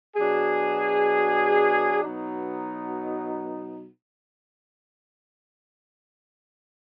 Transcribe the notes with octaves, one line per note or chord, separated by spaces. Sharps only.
B2 F#3 D4 G#4
B2 F#3 B3 D#4